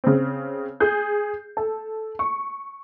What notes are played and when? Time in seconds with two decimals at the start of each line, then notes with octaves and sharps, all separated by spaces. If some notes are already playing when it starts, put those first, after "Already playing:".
0.04 C#3 C4
0.80 G#4 G6
1.57 A4
2.19 C#6